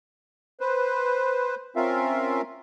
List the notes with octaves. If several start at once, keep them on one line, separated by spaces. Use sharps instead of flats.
B4 C5
C4 C#4 F4 A#4 E5 F5